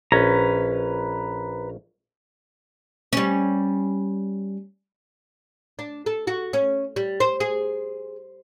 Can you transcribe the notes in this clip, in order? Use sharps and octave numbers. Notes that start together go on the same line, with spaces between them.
A#1 C#4 B4 A#5
G3 C#4
D4
A4
F#4
C#4
G3
C5
G#4